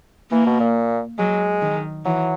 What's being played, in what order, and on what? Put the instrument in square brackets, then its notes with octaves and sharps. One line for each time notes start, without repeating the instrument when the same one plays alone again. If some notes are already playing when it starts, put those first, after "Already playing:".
[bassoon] E3 [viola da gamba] A#3
[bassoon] B2
A#2
[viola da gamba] F#3 [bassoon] G#3
[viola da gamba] D#3
[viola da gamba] E3 [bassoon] F#3